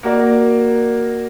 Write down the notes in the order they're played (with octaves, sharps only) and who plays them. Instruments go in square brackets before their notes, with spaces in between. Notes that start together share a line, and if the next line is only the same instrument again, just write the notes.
[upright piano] A#3 F#4 A#4 D5